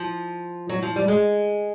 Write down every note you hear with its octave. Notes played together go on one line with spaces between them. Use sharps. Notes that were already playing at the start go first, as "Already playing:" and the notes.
Already playing: F3
F#3
F3
G3
G#3